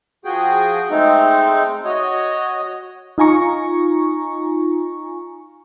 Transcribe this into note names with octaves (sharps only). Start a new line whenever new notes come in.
F3 F#4 G#4 G5
G#3 A3 C4 D#4
F#4 C#5 D#5
D#4 F4 G#5 A#5 C#6